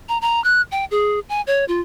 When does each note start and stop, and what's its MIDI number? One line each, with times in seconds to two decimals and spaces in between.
0.09 0.18 82
0.22 0.42 82
0.44 0.62 90
0.72 0.85 79
0.91 1.19 68
1.29 1.41 80
1.47 1.65 73
1.68 1.81 65